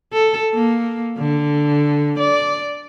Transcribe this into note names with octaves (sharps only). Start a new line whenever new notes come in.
A4
A#3
D3
D5